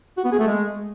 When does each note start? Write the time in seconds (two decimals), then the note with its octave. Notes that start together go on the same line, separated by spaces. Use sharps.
0.17 F#4
0.25 B3
0.32 G#4
0.39 A3
0.47 G#3